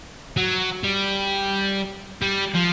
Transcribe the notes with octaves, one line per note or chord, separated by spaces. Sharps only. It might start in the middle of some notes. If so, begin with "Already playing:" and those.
F#3
G3
G3
F3